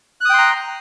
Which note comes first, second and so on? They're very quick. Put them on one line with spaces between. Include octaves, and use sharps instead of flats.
F#6 D#6 G5 C6 A#5